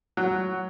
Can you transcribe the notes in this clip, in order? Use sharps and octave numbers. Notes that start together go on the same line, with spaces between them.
F#3